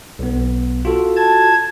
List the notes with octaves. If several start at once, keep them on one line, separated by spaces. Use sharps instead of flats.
B1 B3
F4 F#4 A4
A5 G#6